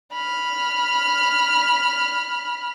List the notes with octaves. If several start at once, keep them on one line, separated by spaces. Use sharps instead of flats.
B5 F6